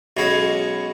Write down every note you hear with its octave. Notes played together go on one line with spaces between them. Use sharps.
B1 B2 G#3 C#4